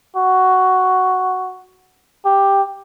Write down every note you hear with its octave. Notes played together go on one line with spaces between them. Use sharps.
F#4
G4